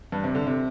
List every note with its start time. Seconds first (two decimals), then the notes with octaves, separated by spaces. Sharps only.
0.12 G2
0.24 C3
0.35 D3
0.47 C3